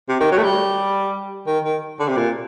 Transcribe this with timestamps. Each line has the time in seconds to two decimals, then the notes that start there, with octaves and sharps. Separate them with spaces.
0.09 C3
0.21 D#3
0.32 F#3
0.38 A3
0.43 G3
1.47 D#3
1.65 D#3
1.99 D3
2.08 C3
2.17 A#2